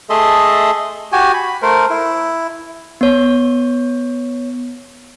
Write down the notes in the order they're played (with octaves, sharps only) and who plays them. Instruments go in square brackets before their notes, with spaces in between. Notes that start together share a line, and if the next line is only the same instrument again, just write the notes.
[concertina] A3 G#4 A4 D#5 E5 C6
[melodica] F#4 G4 G#5
B5
A3 A#4 C5
E4
[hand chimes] B3 C#5